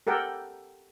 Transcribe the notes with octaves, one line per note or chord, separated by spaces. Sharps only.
G4 A4 A#4 F#5 G5